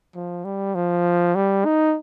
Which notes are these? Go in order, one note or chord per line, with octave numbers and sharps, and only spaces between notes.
F3
G3
F3
G3
D#4